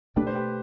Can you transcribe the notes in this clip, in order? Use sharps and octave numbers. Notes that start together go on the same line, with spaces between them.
B2 A3 D4 G4 B4
C5
G4 B4